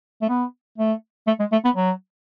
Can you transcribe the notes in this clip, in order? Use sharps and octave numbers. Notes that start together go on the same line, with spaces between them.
A3
B3
A3
A3
G#3
A3
B3
F#3